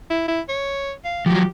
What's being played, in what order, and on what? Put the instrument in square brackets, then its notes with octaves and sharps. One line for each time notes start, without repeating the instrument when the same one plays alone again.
[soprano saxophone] E4
E4
C#5
F5
[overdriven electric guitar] F3 F#3 [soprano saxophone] G4